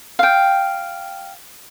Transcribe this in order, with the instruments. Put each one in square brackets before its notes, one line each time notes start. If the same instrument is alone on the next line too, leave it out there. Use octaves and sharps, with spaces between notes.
[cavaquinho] F5 G5